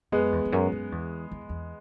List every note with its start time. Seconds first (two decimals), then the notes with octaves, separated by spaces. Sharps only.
0.12 F#2 G#3 B3
0.32 E2
0.45 E2
0.52 F#2
0.72 F#2
0.92 E2
1.32 E2
1.49 E2